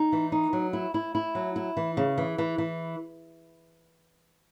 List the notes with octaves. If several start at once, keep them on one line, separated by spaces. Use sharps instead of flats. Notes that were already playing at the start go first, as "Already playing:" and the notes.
Already playing: D#4
E3
D#4
F#3
E4
E4
E4
F#3
E4
E3
C#3
E3
E3
E3